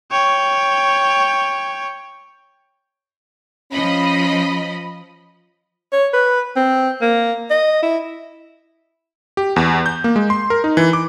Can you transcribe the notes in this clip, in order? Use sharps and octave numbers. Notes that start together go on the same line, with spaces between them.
C#5 G5
F3 C#4 D#5 B5
C#5
B4
C4
A#3
D#5
E4
G4
E2
G6
A#3
G#3
C6
A#4
D#4
E3
D6